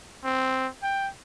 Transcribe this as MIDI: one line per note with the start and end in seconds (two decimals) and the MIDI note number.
0.25 0.68 60
0.83 1.08 79